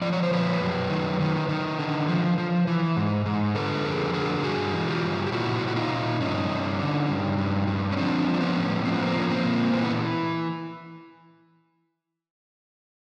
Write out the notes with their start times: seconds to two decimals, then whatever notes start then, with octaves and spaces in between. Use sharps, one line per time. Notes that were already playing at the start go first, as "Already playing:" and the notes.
0.02 F3 D5
0.13 C#5
0.23 C5
0.31 F3 B4 C#5
0.61 F#2
0.90 D#3
1.20 D#3
1.49 D#3
1.79 D3
2.08 F3
2.38 F3
2.67 E3
2.96 G#2
3.26 G#2
3.55 D3 A4 B4
3.84 F2 G#4 A#4
4.14 D3 G#4 A#4
4.43 G2 F#4 G#4
4.73 E3
4.88 F4 G4
5.03 G2
5.26 G4
5.32 A#2 E4 F#4
5.61 A#2
5.67 F#4
5.76 D#4 F4
5.91 A#2
6.20 G2 C#4 D#4
6.50 G2
6.79 D3
7.08 G2
7.38 G2
7.67 G2
7.92 C#4
7.97 F3 C4 D4
8.27 F3
8.34 D4
8.41 B3 C#4
8.56 A2
8.85 F3 C4
8.94 B3
9.03 A#3 C4
9.15 F3 C#4
9.29 A#3 C4
9.44 A#2
9.73 E3 C4
9.83 B3